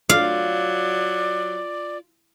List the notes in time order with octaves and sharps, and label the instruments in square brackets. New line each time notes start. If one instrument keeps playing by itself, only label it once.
[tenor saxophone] F#3 [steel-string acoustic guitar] F4 [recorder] D5 [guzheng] F5